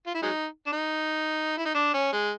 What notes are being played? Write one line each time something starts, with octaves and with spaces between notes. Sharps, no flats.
F4
E4
F#3 G#3 D#4
D4
D#4
E4
D#4
D4
C#4
G#3